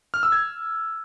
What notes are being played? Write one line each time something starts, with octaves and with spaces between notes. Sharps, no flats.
F6
E6
G#6